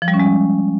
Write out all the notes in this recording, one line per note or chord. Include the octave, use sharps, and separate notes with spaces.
F3
G3
C#4
G#3